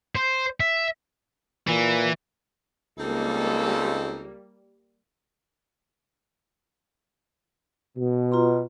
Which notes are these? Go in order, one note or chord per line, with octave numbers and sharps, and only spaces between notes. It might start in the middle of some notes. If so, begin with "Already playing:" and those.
C5
E5
A#2 E3
C#2 G3 A#3 C4 D#4 A4
B2
F4 A#5 C6